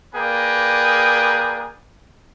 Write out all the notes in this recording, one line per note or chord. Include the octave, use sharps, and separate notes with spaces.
A#3 G#4 A#4 B4 D5 G5